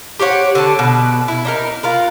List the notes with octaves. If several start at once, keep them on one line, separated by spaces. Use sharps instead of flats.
G4 C5 C#5 F#5
D3 A5
B2 B4
E4
D4 D#4 A#4
F4 A#4 B4